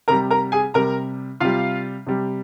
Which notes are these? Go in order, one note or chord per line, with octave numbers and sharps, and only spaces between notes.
C3 G3 A#4 A#5
A#4 A#5
G#4 G#5
C3 G3 A#4 A#5
C3 G3 F4 F5
C3 G3